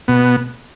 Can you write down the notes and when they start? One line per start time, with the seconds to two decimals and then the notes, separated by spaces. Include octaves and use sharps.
0.08 B2 B3